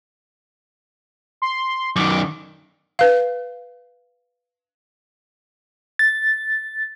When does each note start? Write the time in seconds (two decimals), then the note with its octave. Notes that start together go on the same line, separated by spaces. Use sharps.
1.42 C6
1.96 F#2 D#3 D6
2.99 B4 F5
5.99 A6